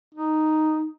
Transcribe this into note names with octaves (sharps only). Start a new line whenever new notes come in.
D#4